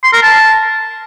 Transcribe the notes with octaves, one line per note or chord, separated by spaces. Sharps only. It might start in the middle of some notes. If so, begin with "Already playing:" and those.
C6
A#4
A5